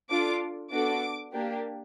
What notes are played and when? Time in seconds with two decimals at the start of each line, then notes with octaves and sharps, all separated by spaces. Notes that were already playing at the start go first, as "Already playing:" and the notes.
0.10 D4 F4 A4 D6
0.72 B3 D4 F#4 A4 D6
1.32 A#3 D4 G4